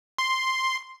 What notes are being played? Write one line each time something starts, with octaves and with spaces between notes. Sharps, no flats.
C6